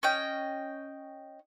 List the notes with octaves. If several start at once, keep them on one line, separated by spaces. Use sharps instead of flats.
C#4 D#5 G5